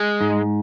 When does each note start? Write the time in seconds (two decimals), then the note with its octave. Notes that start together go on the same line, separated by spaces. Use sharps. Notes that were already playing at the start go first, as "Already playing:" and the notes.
Already playing: G#3
0.21 G#2